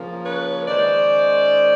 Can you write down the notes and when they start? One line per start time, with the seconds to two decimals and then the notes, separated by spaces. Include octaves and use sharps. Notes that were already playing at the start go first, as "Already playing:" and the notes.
Already playing: C#3 F3 A#3 C#4
0.25 B4 C#5
0.68 D#3 G#3 C#4 C5 D5